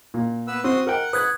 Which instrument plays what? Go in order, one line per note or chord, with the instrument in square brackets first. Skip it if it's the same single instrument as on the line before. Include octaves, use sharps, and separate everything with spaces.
[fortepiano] A#2
[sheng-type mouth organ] B3 B4 E6
[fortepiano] C4 [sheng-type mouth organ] F#4 C6 D#6
[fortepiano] A#4 G5 [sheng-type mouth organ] F#5
[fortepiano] B4 [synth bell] D#6 F#6 G#6